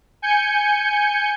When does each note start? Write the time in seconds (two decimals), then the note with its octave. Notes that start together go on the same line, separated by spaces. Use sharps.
0.22 G#5 G6 C#7